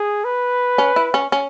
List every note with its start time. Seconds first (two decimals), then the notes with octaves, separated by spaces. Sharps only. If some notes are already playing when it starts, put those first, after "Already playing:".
Already playing: G#4
0.25 B4
0.78 C#4
0.96 E4
1.14 C#4
1.32 C#4